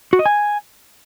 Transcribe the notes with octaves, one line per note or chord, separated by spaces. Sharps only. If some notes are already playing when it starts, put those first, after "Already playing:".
F#4
D#5
G#5